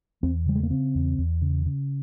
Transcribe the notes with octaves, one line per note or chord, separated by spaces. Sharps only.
E2 C4
C#3 G3
G#3
A#3
C#3 C4
E2
E2
C#3
C#3